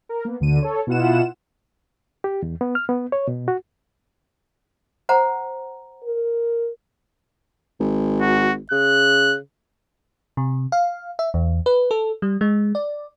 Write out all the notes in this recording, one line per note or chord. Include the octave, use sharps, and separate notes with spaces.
A#4
A#3 B3
D2 D3 D#7
A4 C#5
B2 E4 F4 F#5 E7
G4
E2
B3
F6
B3
C#5
B2
F#4
C5 F#5 A#5
A#4
G#1
F#4
C#3 F#6
C3
F5
E5
E2
B4
A4
G3
G#3
D5